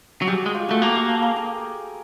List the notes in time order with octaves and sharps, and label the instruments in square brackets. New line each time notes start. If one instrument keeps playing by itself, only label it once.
[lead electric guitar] F#3
[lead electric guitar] G3 [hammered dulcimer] F#4 G#4
[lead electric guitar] G#3
[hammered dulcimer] F4 G4
[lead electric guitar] A3 [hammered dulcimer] F#4 G#4
[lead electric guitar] A#3 [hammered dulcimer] G4 A4
[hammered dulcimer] F#4 G#4
G4 A4
G#4 A#4
G#4 A#4